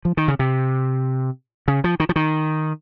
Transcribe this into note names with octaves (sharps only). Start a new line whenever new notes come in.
F3
D#3
C#3
C3
C#3
F3
D#3
F3
D#3